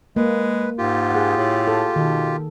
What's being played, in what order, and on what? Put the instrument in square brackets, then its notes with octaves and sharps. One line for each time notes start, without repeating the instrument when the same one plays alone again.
[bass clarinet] G#3 [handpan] A#3 [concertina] B4
[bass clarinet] G#2 [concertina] F4 G4
[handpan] G#4 F#5
[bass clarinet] A2
[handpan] A4
[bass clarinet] B2 [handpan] D#3